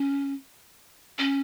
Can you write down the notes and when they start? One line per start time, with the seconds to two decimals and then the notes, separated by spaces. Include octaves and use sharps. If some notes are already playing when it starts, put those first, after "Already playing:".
Already playing: C#4
1.19 C#4